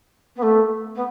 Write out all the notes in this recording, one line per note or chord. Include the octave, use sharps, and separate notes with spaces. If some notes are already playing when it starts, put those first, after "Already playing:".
B3
A3
B3